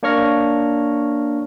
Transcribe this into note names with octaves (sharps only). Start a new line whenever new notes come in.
A#3 D4 C#5 C#6 F6 A#6